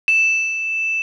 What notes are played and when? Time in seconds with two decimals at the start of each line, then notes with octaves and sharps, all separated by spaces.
0.08 E7